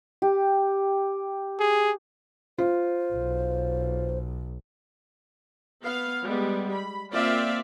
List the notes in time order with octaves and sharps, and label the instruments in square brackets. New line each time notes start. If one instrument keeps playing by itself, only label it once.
[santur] G4
[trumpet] G#4
[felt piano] F4 [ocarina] C5
[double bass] B1
[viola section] B3 F5
G3 G#3 B3
B5
A#3 C4 F4 D5 E5 F5